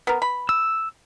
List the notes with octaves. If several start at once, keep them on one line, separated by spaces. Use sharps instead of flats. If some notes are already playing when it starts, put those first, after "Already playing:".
B3 A#4
B5
E6